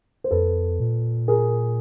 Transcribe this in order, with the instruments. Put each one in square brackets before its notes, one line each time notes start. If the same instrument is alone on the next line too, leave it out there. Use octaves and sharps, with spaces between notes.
[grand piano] C5
[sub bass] F2 [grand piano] A4 B4
[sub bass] A#2
[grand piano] G#4 A#4